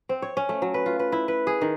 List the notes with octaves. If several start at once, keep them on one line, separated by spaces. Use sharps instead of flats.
C4
C#5
C#4
A3
F#3
B4
F4
B4
E4
B4
G#4
D#3